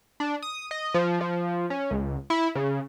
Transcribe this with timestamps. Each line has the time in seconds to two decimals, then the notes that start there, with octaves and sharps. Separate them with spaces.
0.20 D4
0.42 D#6
0.71 D#5
0.94 F3
1.21 F3
1.70 C#4
1.91 C#2
2.30 E4
2.55 C#3